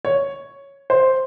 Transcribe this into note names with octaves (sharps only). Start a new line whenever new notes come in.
C#5
C5